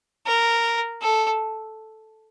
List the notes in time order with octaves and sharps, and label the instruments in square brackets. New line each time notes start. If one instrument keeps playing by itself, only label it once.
[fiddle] A#4
A4